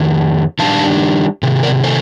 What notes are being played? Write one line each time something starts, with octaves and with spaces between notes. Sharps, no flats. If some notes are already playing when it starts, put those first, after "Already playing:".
Already playing: F2 D#3
D#3 G3 D4 F5 A5
C3 D#3
A#4 D5
A4 C5